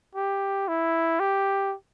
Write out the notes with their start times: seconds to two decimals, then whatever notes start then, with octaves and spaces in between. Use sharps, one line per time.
0.15 G4
0.68 E4
1.20 G4